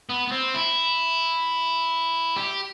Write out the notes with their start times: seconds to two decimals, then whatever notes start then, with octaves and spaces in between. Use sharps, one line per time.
0.10 B3
0.28 B3
0.32 C4
0.55 E4
2.36 G4